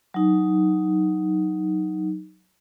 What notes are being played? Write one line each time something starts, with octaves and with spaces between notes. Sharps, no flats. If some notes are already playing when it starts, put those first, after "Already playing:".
F#3 D#4